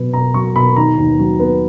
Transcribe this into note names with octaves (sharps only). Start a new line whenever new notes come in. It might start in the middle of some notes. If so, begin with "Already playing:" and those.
Already playing: B2 F#3 B3
B2 A#5
F#3 C#6
B2 B5
D#3 A#5
D#2
F#3
B3